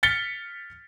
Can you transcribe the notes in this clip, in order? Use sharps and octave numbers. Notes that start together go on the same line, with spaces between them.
F6 A6 B6 C#7 G7